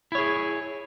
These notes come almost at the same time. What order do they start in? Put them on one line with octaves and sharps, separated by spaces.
E4 C#5 G#4